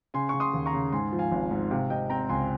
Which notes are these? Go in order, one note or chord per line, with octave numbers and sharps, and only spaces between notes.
C#3 G#5 C6
C#3 C#6
C6 D#6
D#2
A#5 C#6
C#3
G#2 G#5 C6
F3
F5 G#5
G#1
G#2
C3 F5
C3 D#5 G5
C4 G5 A#5
C#2 G#5 C6